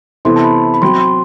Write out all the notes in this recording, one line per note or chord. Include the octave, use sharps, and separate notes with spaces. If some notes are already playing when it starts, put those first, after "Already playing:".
C3 E3 B3 E4 A4 C6
A5
B5
B5
F#3 C4 F#4 C6
C6